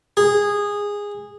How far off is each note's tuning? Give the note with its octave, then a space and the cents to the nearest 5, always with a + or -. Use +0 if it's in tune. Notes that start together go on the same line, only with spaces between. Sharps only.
G#4 -15